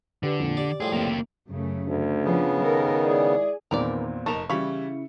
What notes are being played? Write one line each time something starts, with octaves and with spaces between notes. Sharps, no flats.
D3 G4 B4 D5
F2 A#2
G4 D5
A2 F3 G3 G#4
F#1 C3 A#3 G4
F#2 C#3 A3
D2
C#3 F3 B3 D4
D#3 A4 A#4
G#3 E4 G#4 D5
E2 A#2 D#3 C4 A#4 B4 D5
F1 D#4 A#4 D#5 A5 C#6
C#3 E3 G3 E4 F5 B5 C#6